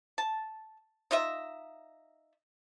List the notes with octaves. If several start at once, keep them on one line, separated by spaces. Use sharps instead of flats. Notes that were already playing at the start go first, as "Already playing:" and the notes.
A5
D#4 F4 D#5 E5